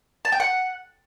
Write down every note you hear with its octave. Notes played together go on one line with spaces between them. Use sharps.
A5
G5
F#5